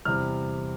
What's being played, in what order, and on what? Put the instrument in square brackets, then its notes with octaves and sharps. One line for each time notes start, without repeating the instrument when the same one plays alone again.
[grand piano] E2 C3 G3 F6